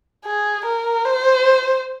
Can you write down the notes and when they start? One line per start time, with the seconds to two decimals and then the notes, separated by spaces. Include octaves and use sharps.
0.25 G#4
0.66 A#4
1.05 C5